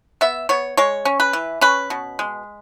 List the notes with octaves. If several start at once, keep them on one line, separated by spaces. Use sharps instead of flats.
B3 E5
B3 C#5
G#3 C#5
C#4
B4
E3
C#4 B4
B2
G#3